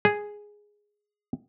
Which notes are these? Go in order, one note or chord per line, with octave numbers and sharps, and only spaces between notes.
G#4